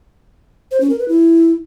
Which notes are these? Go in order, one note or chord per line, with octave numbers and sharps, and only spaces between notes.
C5
C#4
A#4
B4
E4